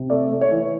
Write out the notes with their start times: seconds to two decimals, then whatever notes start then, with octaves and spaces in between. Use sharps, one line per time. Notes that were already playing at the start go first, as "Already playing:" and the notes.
Already playing: C3
0.10 A3 D5
0.31 A3
0.41 C#5
0.51 E3